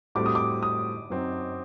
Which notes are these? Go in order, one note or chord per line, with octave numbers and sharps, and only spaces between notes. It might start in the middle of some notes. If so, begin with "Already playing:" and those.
A2 G3 C4 F#4 D6
D#6
D6
D#6
F#2 F#3 C4 D#4